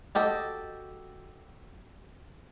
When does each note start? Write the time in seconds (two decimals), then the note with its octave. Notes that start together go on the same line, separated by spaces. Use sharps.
0.15 F#4 G4 A4 D#5